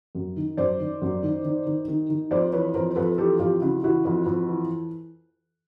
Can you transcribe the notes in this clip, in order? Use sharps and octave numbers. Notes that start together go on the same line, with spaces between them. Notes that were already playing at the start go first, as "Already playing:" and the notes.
F#2
D#3
F#2 C5 D5
D#3
F#2
D#3
D#3
D#3
D#3
D#3
F2 C5 D5
E3 B4 C#5
F2 A#4 C5
C5
F2 A4 B4
E3 G4 A4
F2 F4 G4
C#3 E4 F#4
E3 E4 F#4
F2
F2
E3